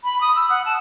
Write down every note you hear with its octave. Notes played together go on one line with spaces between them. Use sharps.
B5
D#6
E6
F#5
A5